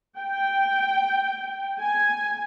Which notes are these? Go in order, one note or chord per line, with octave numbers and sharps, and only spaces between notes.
G5
G#5